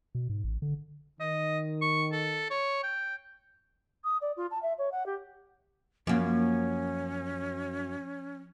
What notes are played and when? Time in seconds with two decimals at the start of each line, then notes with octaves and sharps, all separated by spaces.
0.15 B2
0.29 G#2
0.44 A1
0.62 D3
1.20 D#3 D#5
1.82 C#6
2.12 A4
2.51 C#5
2.83 G5
4.04 D#6
4.21 D5
4.37 F4
4.51 A5
4.63 E5
4.78 C#5
4.92 F#5
5.06 G4
6.07 F#2 F3 A#3 C#4